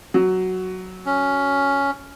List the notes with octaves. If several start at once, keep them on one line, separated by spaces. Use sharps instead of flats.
F#3
C#4